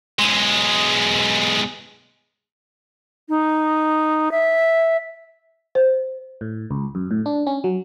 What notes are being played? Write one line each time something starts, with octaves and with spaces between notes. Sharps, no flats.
B1 G#3
D#4
E5
C5
A2
C#2
F#2
A2
D4
C#4
F#3